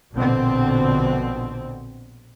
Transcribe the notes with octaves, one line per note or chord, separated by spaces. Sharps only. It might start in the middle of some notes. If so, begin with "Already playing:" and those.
A#1 B2 D3 C4